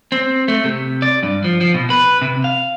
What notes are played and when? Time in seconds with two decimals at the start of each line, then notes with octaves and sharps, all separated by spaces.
0.12 C4
0.48 A3
0.64 C3
1.02 D5
1.23 G2
1.44 F3
1.61 F3
1.74 B2
1.90 B4
2.22 C3
2.44 F5